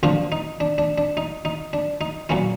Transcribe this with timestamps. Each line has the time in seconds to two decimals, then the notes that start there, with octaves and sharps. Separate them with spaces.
0.03 D3 F3 A#3 D4 F4
0.32 D#4
0.60 D4
0.78 D4
0.98 D4
1.17 D#4
1.45 D#4
1.73 D4
2.01 D#4
2.29 A#2 F#3 A#3 C#4 E4